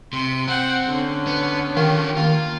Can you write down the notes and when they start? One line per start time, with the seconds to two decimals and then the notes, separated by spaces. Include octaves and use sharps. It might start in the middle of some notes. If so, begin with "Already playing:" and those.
0.13 C3 C6
0.48 C4 F#5 G5
0.87 D3 C#4
1.27 B3
1.77 D#3 F4 G4
2.17 A#3 F4